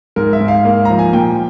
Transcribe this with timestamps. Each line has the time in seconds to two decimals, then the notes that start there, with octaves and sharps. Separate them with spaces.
0.16 G#2 A#4
0.33 E5
0.41 G#2
0.48 F5
0.65 A#3
0.85 F3 A#5
0.99 G#5
1.13 A#2 G5